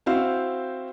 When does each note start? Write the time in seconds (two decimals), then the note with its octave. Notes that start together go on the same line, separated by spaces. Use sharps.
0.06 C4 E4 F#4 C5 F5